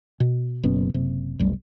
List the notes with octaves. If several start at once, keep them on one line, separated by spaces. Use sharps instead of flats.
B2
F#1 B2 C#4
F#1 C3
F1 B1 G3